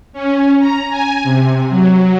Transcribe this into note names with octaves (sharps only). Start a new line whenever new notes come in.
C#4
A#5
G#5
C3
F#3